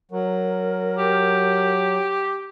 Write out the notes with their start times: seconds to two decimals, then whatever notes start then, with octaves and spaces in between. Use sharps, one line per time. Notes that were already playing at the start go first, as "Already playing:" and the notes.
0.11 F#3 A#4
0.99 G4